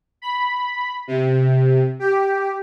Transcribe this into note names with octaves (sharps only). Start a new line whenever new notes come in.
B5
C3
G4